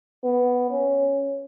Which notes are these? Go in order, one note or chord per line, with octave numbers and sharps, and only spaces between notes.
B3
C#4